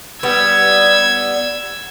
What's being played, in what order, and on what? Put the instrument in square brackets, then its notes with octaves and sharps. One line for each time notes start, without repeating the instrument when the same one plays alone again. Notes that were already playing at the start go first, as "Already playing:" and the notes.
[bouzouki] G3 B3 [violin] E6 G#6